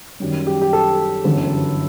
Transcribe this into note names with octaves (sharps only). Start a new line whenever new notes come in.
F#2 D#3 G3
G4
G4
A4
G1 F#2 E3